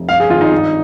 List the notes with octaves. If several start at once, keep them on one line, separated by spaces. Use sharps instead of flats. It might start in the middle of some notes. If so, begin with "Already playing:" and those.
Already playing: F1
G2 F5
G#4
G#1 F4
D#4
G2